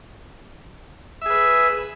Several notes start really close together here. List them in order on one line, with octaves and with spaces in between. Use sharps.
E5 G#4 B4